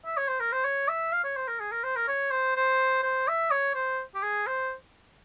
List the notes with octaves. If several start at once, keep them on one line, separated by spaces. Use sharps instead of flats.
E5
C#5
C5
A#4
C5
C#5
E5
F5
C#5
C5
A#4
G#4
A#4
C5
A#4
C#5
C5
C5
C5
E5
C#5
C5
G4
G#4
C5